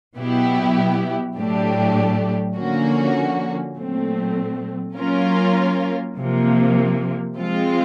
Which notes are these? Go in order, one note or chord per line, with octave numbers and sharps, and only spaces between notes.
B2 F#3 B3 E4 G4
A2 F#3 A3 D4 G4
D3 F3 A#3 C#4 F#4
A#2 F#3 A3 C4
F#3 A#3 C#4 F4 A#4
C3 F3 A#3
F3 G#3 C4 F4